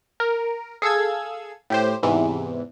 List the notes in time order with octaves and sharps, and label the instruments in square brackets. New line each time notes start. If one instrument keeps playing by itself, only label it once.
[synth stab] A#4
G#4 A4 F5 E6 G#6
A2 G4 C5
E2 G#2 C3 E3